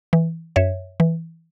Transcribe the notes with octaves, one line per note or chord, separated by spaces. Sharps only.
E3
F#2 C#5 E5
E3